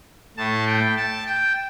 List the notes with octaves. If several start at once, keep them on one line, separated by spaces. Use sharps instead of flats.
A2 A3 A5
G5
A5
G5